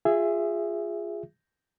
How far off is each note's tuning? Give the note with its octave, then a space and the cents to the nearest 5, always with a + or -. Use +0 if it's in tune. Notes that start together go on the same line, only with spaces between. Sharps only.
F4 +5 G#4 -10 E5 +15